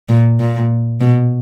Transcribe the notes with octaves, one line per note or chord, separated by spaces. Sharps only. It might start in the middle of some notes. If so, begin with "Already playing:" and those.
A#2
A#2
B2